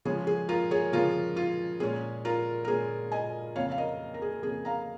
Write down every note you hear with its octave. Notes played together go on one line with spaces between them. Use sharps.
C#3 F3 G#3 C#4 G#4
G#4
F4 A#4
G#4 C#5
C#3 F3 G#3 C#4 F4 A#4
F4
A#2 G#3 C#4 G#4
F4 A#4
A#4
A#2 G#3 C#4 G#4
D#5 G#5
F2 C#3 A#3 C#5 F5
F5
A#4 D#5
A#4
G#4
F2 C#3 A#3 G#4
F5 A#5